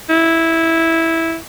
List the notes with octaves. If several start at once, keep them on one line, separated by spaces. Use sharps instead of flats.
E4